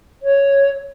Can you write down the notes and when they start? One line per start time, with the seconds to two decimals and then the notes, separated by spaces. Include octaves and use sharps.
0.23 C#5